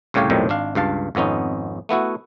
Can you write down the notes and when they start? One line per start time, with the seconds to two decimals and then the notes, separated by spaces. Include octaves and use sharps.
0.14 C2 A2 C#3 G4 C#5 F5
0.30 B1 F2 A2 C3 D#3 G3
0.49 G#1 D4 F5
0.75 C#2 G2 F5 A5
1.15 G#1 F2 B3 C#4 D#4
1.89 A3 B3 E4 F#4